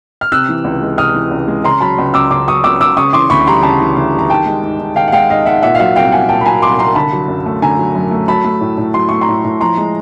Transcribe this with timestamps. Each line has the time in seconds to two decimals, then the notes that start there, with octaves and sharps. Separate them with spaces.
0.21 F6
0.32 C3 E6 F#6
0.49 E3
0.64 C#2
0.81 G#3
0.98 C3 D#6 F6
1.15 E3
1.31 C#2
1.48 G#3
1.64 C#3 A#5 C6
1.81 F#3 A5 B5
1.98 C#2
2.14 C#2 D6 E6
2.31 C#3 C6 D6
2.48 F#3 C#6 D#6
2.64 C#2 D6 E6
2.80 C#2 D6 E6
2.97 C#3 C#6 D#6
3.13 E3 C6 D6
3.30 D2 B5 C#6
3.47 G3 A#5 C6
3.63 C#3 A5 B5
3.80 E3
3.96 D2
4.13 G3
4.19 A#5
4.30 D#3 G5 A5
4.46 G#3
4.63 G#2
4.80 G#2
4.96 D#3 F5 G5
5.08 F#5
5.12 G#3 F5 G5
5.30 G#2 D#5 F5
5.46 G#2 E5 F#5
5.62 A#2 E5 F#5
5.75 F5
5.80 F#3 E5 F#5
5.96 C2 F5 G5
6.12 C2 F#5 G#5
6.29 A#2 G5 A5
6.41 B5
6.45 F#3 G#5 A#5
6.62 C2 C6 D6
6.78 C2 A#5 C6
6.95 D3 A5 B5
7.12 F#3
7.28 F#2
7.46 A3
7.62 D3 G#5 A#5
7.79 F#3
7.95 F#2
8.11 A3
8.28 F#3 A5 B5
8.44 A3
8.61 A2
8.77 A2
8.94 F#3 C6
9.09 A3 C#6
9.21 A#5 C6
9.28 A2
9.44 A2
9.61 F3 A#5 C6
9.78 G#3